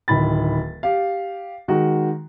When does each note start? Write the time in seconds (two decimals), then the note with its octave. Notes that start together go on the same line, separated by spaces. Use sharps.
0.08 D1 D#3 B5 A6
0.83 G4 F5
1.68 D#3 G#3 F#4